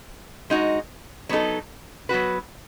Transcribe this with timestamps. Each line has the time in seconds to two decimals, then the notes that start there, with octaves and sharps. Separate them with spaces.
0.50 G#3 D#4 F#4
1.29 F#3 B3 D#4 A4
2.09 F#3 B3 F#4 B4